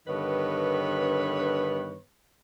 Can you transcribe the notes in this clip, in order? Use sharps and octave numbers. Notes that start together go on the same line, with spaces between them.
G2 D3 D#3 B3 B4 C#5